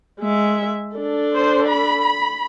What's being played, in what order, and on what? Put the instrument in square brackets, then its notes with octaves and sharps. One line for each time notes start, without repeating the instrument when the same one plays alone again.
[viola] G#3 E5
D4 A4
[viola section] C5
B5